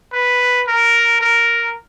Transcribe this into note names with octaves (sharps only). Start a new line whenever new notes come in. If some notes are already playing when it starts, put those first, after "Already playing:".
B4
A#4
A#4